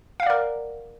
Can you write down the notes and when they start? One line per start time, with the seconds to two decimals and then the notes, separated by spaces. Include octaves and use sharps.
0.20 F5
0.23 F#5
0.26 D5
0.30 A#4